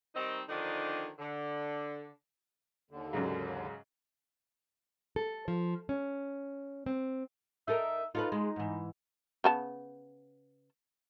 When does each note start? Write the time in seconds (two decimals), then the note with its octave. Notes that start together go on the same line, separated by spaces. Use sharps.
0.15 D#3 G3 C4 D#4
0.49 D3 D#3 F3 C4 D4 D#4
1.19 D3
2.91 D#2 D3
3.13 G#2 C#3 F#3
5.16 A4
5.48 F3
5.89 C#4
6.86 C4
7.68 D#4 A4 A#4 E5
8.15 D#4 F4 A4 B4
8.32 G#3
8.56 G#2 E3
9.44 C#3 B3 A5